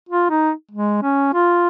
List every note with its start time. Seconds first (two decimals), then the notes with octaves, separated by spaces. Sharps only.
0.09 F4
0.30 D#4
0.71 G#3
1.03 C#4
1.33 F4